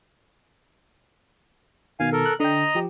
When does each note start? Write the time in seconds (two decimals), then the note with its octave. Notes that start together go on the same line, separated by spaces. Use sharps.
2.00 B2 D#3 F5 G#5
2.13 A4 A#4
2.26 F#6
2.40 D3 D#5 G5 A#5
2.75 F3 G4